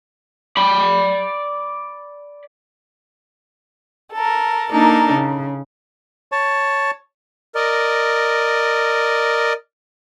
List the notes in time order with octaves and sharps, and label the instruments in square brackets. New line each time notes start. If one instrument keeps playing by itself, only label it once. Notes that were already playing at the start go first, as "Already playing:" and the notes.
[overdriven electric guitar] D5 B5
[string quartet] A4 A#4
A#3 D4 D#4 A4 A#4
C#3
[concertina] C#5 A5
[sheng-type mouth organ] A#4 D5 D#5